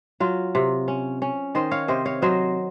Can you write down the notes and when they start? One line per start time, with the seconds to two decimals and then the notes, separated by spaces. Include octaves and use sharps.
0.20 F#3 F4
0.55 C3
0.88 C#4
1.22 C#4
1.55 D#3 C5 D#5
1.71 C#5 F5
1.88 C3 C5 D#5
2.06 C#5 F5
2.22 F#3 C5 D#5